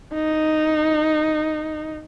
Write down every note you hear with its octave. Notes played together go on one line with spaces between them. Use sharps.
D#4